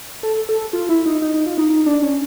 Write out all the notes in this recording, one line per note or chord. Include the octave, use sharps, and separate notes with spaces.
A4
A4
F4
E4
D#4
D#4
D#4
F4
D#4
D#4
D4
C#4